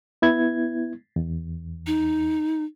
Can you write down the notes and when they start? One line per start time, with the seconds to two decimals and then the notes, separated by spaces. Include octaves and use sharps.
0.22 B3 E4 G#6
1.16 E2
1.87 D#4